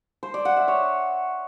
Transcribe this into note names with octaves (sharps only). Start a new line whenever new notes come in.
C5
D5
F#5
E5
C#5